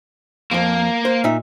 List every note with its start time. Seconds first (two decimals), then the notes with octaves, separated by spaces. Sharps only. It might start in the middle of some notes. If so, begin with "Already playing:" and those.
0.51 F2 F3 A#3
1.05 C5
1.24 A#2 D#4 E5